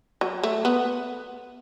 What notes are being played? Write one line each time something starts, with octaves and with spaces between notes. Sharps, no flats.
F#3
A3
B3